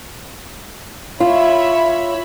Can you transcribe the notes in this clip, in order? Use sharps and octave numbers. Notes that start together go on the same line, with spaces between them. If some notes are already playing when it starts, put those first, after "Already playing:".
F4 C#5 E5 B5